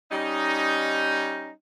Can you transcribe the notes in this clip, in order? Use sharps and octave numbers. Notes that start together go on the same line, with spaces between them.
G3 C#4 D#4